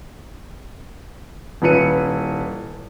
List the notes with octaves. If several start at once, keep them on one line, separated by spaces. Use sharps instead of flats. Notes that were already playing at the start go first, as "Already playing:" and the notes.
D#1 E4 B4 C#7 D#7